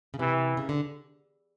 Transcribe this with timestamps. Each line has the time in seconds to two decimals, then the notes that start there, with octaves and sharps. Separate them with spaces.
0.14 C#3
0.19 C3 E3
0.57 C#3
0.69 D3